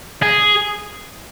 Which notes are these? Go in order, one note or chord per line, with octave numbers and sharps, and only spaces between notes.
G#4